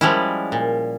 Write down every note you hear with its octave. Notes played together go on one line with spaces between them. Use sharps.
F3 G3 G#3 C#4 E4
A#2